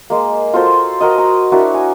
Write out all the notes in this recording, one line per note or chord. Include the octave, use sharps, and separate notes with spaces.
G#3 A#3
F4 F#4 A4 C5
F#4 A#4 D#5
A#5
D4 E4 F#4 A#4
G#5